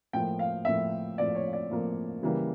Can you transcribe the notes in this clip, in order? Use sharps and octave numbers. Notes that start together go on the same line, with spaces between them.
A2 F3 A#3 G5
F5
A2 F3 A#3 E5
A2 F3 A#3 D5
C#5
D5
A2 F3 A#3
C#3 E3 G3 A#3